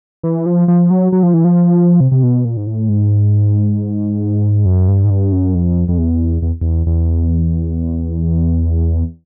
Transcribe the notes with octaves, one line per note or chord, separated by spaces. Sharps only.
E3
F3
F3
F#3
F#3
F3
E3
F3
C3
C3
B2
A#2
G#2
A2
G#2
F#2
G2
G#2
G2
F#2
F2
F2
E2
E2
E2
E2